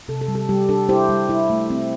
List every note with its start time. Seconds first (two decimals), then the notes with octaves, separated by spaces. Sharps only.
0.08 C3 A4
0.21 A4
0.28 G3
0.35 A4
0.49 G3 G4
0.69 D4 A4
0.89 E4 G4 C5
1.09 G3
1.29 E4
1.50 A3
1.70 C4